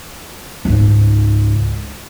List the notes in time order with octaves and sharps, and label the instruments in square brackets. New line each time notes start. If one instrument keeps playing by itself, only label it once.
[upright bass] C#2 G#2